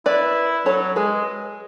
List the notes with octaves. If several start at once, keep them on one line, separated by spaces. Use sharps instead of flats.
E4 B4 D5
F#3 A4 C#5
G#3 G#4 B4